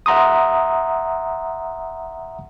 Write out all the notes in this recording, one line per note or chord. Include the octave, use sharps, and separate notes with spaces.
E5 F#5 A#5 C6 D#6